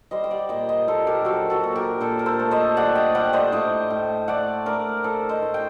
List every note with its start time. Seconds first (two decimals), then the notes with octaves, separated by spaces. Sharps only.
0.11 G3 C5 D#5
0.24 G5
0.31 D5 F#5
0.49 A#2 D#5 G5
0.69 C5 D#5
0.87 A#2 A4 C5
1.07 G4 A#4
1.25 F#3 F#4 A4
1.50 F#4 A4
1.64 A#2
1.76 G4 A#4
2.00 A#2 A4 C5
2.19 A#4
2.26 A4 C5
2.39 A3
2.51 C5 D#5
2.77 G3 D5 F#5
2.95 D#5 G5
3.15 G3 D5 F#5
3.33 C5 D#5
3.52 A2 D#5 G5
3.90 A2
4.28 A3 D5 F#5
4.66 A3 A#4 D5
5.04 A2 A4 C5
5.29 C5 D#5
5.42 A2
5.54 G5